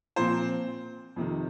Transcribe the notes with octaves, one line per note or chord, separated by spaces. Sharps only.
A#2 F3 C4 C5
F2 C3 D#3